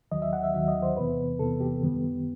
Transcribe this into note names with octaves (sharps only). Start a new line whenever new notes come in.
D#2 D#3 F#3 D#5
E5
F#5
E5
D#2 D#3 F#3 E5
D#5
C5
E2 C3 E3 B3 B4
E2 C3 E3 B3 A4
G4
F#2 D#3 G3 B3